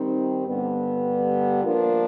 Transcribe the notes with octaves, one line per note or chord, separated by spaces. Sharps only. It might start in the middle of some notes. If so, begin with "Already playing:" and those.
Already playing: D#3 G3 C4 D#4
G2 D3 G3 B3
F3 A#3 D4 F4 A#4